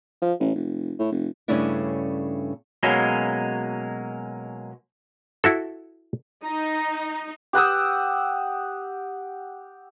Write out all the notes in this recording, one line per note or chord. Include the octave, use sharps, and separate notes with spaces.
F3
A1
F1
A2
F1
G2 C#3 A3 C#4 D4 E4
B2 F#3 G#3 A#3 C#4
E4 F#4 A4
D#4 A#5
G4 F#5 D#6 E6